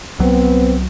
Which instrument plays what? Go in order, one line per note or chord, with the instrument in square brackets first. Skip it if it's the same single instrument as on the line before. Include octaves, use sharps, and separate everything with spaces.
[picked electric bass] C2 F#3 [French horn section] B3 C4